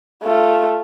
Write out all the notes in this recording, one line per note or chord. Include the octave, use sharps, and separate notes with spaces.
A3 F4